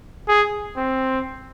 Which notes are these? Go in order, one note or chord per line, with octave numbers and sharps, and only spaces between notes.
G#4
C4